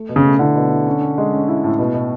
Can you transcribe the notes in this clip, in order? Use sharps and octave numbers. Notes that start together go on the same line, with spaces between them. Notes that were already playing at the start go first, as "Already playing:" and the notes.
Already playing: A3
B2
C#3
A3
D3 E4
B2
E4
C#4
C#4
G#3
C#4
E4
A2
B2
B2